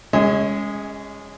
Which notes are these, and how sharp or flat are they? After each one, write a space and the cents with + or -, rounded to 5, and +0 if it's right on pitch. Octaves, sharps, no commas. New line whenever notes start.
G#3 -15 C#4 +5 D#5 +40